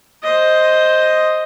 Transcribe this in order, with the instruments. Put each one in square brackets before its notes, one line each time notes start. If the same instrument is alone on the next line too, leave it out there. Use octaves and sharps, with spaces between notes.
[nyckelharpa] C5 D#5